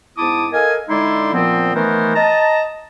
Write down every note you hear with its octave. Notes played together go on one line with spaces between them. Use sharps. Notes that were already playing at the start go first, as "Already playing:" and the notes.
G#2 B3 E4 A5 D6 D#6
A4 A#4 D#5 F5 G#5
D3 G#3 D#4 E4 D5 C6
A#2 F3 B3 C4
D#3 E3 A3 B3 A#4 C5
D#5 A5 A#5